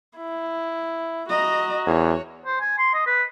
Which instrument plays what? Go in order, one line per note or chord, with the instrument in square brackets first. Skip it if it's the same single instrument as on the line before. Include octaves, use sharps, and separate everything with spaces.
[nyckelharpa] E4
[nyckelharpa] F#4 [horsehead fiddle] D#5 A#5
[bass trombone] E2 [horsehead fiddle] C#5
[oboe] C5
G#5
C6
D#5
B4